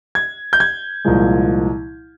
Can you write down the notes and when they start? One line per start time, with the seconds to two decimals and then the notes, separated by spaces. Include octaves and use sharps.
0.15 G#6
0.53 G6
0.60 G#6
1.05 C2 A#2 F3 G#3